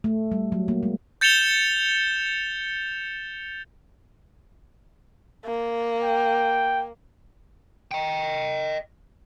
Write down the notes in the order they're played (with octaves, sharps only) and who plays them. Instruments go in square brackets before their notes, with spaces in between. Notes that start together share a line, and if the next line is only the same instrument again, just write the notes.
[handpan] A3
G3
F#3
A#3
G#3
[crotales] G6 A6 C#7 E7 F7 G7
[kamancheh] A#3
[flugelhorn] G5
[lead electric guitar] D#5 G5